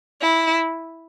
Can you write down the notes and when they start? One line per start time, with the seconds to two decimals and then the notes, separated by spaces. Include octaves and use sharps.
0.21 E4